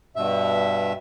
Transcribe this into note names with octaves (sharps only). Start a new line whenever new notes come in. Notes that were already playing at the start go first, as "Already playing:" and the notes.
G2 B2 E5